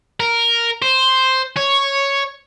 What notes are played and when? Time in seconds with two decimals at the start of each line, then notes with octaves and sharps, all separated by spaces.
0.20 A#4
0.82 C5
1.57 C#5